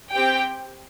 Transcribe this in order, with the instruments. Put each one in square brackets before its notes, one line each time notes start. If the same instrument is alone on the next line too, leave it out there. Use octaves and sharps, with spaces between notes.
[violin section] C4 G4 G5